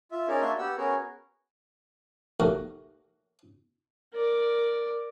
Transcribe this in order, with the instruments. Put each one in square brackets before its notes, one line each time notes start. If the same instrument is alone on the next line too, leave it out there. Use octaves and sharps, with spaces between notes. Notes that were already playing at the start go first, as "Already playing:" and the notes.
[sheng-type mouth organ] F4 E5
C#4 D#4 G#4 A#4 D5
A#3 D4 F#4 E5 C6
B3 G4 F#5 E6
B3 C#4 F#4 G#4 A#4
[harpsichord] D#2 A3 F#4 A#4
[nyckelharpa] A#4 D5